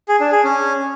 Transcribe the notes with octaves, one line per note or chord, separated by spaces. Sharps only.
G#4
D4
G#4
C#4